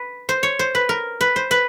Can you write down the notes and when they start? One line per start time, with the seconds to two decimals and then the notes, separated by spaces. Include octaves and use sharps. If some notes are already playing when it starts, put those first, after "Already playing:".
Already playing: B4
0.29 C5
0.43 C#5
0.59 C5
0.75 B4
0.89 A#4
1.21 B4
1.36 C5
1.51 B4